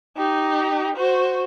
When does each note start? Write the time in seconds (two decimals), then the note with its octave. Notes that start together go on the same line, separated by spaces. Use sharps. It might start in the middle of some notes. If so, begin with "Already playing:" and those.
0.17 D#4 G4
0.96 F#4 C5